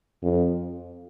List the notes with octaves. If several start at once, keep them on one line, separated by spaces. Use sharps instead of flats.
F2